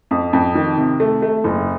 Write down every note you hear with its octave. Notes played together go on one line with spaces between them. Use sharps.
F2
F2
D#3
C3
A3
A3
F#1